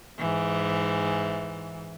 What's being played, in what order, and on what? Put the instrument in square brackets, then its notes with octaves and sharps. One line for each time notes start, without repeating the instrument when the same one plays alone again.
[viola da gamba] G#2 E3